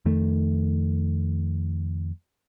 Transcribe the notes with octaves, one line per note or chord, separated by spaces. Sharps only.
F2 D#3 A3